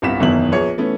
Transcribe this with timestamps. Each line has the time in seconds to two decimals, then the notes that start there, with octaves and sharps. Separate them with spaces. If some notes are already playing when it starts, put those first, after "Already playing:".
0.02 G1 C2 G2 B6 E7
0.20 F#1 E2 B2 D#3 E5 F#7
0.52 A#1 B3 G#4 C#5 C#7
0.78 E3 A3 B3 C#4